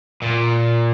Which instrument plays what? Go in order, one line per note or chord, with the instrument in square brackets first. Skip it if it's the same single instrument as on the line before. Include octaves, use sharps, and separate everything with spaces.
[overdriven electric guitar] A#2